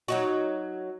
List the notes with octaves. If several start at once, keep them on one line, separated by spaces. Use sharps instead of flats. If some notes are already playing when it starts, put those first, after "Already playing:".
F#3 D#4 F#4